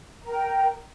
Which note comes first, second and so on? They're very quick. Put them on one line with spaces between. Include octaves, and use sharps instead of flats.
A#5 A#4 G5